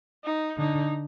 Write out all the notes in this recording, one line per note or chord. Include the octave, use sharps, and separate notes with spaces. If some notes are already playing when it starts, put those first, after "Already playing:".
D#4
D3 D#4